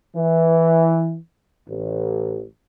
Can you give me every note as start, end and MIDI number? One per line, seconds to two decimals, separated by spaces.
0.15 1.17 52
1.68 2.44 33